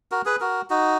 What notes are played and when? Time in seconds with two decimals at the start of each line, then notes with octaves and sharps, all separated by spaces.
0.11 F#4 A#4
0.25 G#4 B4
0.40 F#4 A#4
0.70 D#4 F#4